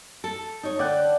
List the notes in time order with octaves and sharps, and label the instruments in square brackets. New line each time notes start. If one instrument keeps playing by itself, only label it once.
[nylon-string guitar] A4
D#4 C#5
[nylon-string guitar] D3 [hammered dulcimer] D5 F#5 G5